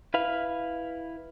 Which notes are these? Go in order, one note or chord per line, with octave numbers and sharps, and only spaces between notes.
E4 B4 F5